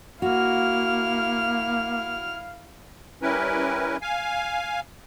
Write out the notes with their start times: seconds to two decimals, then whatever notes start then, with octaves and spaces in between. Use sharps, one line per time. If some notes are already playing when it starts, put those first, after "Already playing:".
0.22 A#3 E4 F#4 F5 F6
3.22 G3 C#4 E4 A#4 B4
4.02 F5 G#5